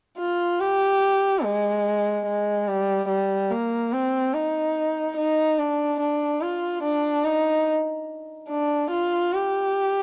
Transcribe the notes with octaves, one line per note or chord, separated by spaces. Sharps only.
F4
G4
G#3
G#3
G3
G3
A#3
C4
D#4
D#4
D4
D4
F4
D4
D#4
D4
F4
G4